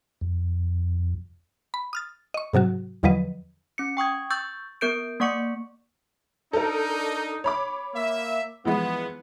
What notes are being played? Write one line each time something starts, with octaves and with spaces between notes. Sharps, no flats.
F2
B5
D#6 F6 A6
D#5 C#6
G#2 C3 F#3 F#4
E2 D3 F3 F#3 B4 D#5
C#4 C#7
G5 C#6 D#6 G#6
C#6 E6 G6 A6
B3 A#4 G6 D7
A#3 D5 F#5 C#6 D6 C#7
D4 D#4 A4 A#4
C#5 B5 D6
A#3 E5
E3 F3 G#3 B3